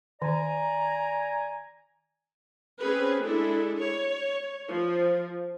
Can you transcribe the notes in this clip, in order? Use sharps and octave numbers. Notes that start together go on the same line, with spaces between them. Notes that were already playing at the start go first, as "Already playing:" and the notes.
D#3 D5 G#5 A#5
C4 C#4 G#4 B4
G#3 D4 E4 A4
C#5
F3